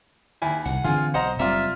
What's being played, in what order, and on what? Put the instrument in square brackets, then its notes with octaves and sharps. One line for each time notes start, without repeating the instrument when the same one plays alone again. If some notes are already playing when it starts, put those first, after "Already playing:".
[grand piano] D#2 G#5 [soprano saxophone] E4
[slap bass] C2 [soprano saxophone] F#5
[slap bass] D3 E3 C4 [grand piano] F4 G#4
[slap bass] B1 [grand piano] C5 D#5 A#5 [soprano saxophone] F#5
[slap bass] F#1 G3 C4 [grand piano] F4 D5 A#5 [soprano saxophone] E5